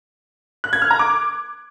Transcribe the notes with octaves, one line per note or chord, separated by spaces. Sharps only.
F#6
G#6
F6
A#5
D6